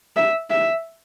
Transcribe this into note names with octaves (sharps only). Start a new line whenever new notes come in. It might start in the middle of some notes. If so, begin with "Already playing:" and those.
E5
E5